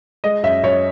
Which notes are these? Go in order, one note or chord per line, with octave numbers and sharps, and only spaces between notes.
G#3 D#5
F#2 E5
F#2 C#5